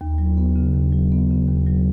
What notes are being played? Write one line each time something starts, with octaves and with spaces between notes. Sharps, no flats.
D#2
F#3
B3
C#3
D#2
F#3
B3
C#3
D#2
F#3